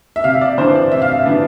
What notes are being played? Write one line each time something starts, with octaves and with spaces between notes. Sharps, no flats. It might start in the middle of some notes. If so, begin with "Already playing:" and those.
E5
C3 F5
E5
D5
E3 B3 D4 C5
D5
C3 E5
F5
E5
E3 B3 D4